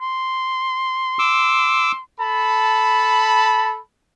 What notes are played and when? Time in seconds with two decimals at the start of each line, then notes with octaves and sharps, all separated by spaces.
0.01 C6
1.19 D6 E6
2.19 A4 A5 B5